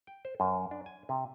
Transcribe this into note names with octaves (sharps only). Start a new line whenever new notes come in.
G5
C5
F#2
D4
G#5
C3